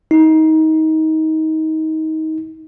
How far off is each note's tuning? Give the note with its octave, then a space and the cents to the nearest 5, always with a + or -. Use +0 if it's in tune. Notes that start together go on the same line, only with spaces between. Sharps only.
D#4 +25